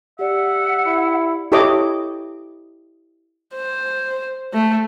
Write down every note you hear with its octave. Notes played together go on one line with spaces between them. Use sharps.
G4 D5 E5 F#5
E4
E4 G4 A4 C#5 D#5 D6
C5
A3